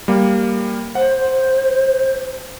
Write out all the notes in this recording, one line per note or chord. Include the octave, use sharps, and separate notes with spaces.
G3 A#3
C5 F#5